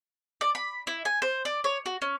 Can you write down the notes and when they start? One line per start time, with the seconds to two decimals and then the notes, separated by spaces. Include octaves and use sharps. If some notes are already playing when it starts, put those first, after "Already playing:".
0.41 D5
0.55 B5
0.87 E4
1.05 G#5
1.22 C5
1.45 D5
1.64 C#5
1.86 F#4
2.02 C#4